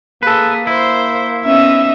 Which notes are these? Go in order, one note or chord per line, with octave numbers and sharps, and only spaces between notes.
A#3 G#4 A4 B4
E4 C5
B3 C#4 D#4 E5